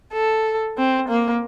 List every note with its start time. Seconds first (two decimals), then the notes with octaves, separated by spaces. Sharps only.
0.13 A4
0.78 C4
1.09 A#3